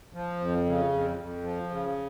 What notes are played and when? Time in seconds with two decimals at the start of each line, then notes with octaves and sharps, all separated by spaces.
0.14 F3
0.40 F2
0.65 C#3
0.91 F2
1.18 F2
1.43 F3
1.70 C#3